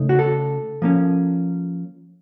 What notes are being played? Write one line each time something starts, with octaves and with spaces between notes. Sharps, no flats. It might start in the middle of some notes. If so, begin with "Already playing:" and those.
Already playing: C#3 A3 D#4
F#4
A4
F3 A#3 C#4